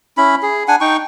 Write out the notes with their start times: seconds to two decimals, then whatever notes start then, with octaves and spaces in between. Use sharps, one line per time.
0.17 C#4 E4 B5
0.43 G#4
0.68 D4 F#5 G#5
0.81 D#4 G5 C#6